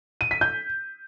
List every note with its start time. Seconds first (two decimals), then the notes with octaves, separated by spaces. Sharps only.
0.21 D#7
0.31 B6
0.41 G6